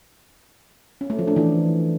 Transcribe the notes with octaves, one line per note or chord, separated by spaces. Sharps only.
C#4
A3
F3
D4
E3